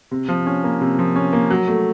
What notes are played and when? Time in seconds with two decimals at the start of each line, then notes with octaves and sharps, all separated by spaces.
0.11 C3
0.29 F3
0.46 C#4
0.64 A#3
0.81 C3
0.99 F3
1.16 C#4
1.33 A#3
1.51 F#3
1.68 A3